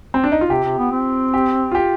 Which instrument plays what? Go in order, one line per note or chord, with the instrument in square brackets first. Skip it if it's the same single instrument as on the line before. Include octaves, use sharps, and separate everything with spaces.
[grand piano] C4
D4
D#4
F4
[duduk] C3 [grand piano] G4
[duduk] C3
B3
C4
[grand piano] G4
F4
G4